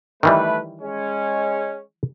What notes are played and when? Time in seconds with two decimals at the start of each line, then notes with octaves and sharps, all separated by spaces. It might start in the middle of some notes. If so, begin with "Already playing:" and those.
0.23 D#3 E3 G3 A3 B4
0.81 G#3 C#4